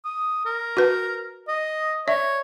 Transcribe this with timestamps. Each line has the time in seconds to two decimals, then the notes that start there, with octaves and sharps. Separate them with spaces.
0.05 D#6
0.45 A#4
0.77 F#4 B4
1.48 D#5
2.08 C#5 D5 E5